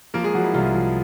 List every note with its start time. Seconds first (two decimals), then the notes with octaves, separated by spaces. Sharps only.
0.14 F3 A#3 A#4
0.24 G#3 G#4
0.34 F3 F#3 F#4
0.44 E4
0.54 C2 F3 F4
0.74 F3